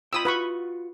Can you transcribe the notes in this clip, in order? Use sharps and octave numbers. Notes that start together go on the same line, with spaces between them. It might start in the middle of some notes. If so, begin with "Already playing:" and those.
F4 C5 G5 B5 D#6 E6
F4 F#4 B4 B5 C#6